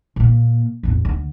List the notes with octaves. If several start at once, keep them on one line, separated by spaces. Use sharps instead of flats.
A#2 A#3
A1 E2
D2